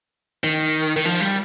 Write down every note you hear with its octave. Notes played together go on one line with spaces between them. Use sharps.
D#3
D#3
F3
G3